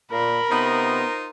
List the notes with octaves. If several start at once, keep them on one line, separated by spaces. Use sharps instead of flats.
A#2 A#4 B5
C3 B3 D#4 F4 C5